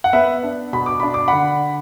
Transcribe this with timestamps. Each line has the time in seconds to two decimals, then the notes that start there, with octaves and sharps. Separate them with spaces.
0.04 F#5
0.13 B3 B4 E5
0.43 D4
0.73 B2 B5
0.86 D6
1.00 D4 B5
1.14 D6
1.28 D3 F#5 B5